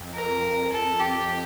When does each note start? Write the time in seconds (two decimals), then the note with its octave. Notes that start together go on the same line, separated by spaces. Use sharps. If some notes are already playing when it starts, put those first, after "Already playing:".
Already playing: F2
0.14 A#4
0.72 F2 A4
1.00 G4